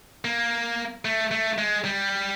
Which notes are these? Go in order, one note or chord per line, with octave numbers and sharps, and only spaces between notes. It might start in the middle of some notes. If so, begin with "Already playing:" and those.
A#3
A3
A3
G#3
G3